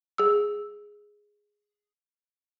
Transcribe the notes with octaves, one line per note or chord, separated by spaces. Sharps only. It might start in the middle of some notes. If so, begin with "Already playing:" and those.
G#4 E6